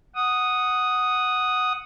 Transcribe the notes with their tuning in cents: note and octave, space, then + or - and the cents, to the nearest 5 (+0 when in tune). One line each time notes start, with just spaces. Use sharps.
F#5 +0 D#6 +0